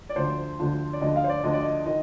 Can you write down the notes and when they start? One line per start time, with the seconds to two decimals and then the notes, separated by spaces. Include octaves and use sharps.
0.09 D5
0.16 D2 D3 F3 C5
0.59 D2 D3 F3
0.93 D5
1.01 D2 D3 F3 D#5
1.16 F5
1.24 C5
1.29 D5
1.44 D2 D3 F3 D#5
1.53 D5
1.62 D#5
1.86 D#3 D#5